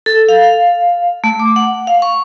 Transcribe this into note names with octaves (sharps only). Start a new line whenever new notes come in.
A4
F5
A3
D6
F#5
F5
C#6